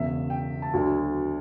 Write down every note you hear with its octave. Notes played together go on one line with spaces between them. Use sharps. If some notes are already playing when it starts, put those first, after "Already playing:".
Already playing: E1 E2 C#3 E5
G5
A5
D2 D3 F#3